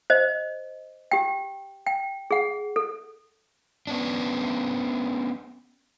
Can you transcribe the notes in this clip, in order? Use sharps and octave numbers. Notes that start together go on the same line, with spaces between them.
C5 D#5
G4 G5
G5
G#4 F#5
A4
B3 C#4 D4